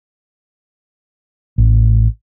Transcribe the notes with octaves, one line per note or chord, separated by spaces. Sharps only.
A1